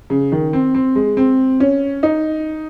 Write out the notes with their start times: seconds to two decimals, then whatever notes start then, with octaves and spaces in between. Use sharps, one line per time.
0.10 C#3
0.32 D#3
0.53 C4
0.75 C4
0.96 G#3
1.17 C4
1.60 C#4
2.03 D#4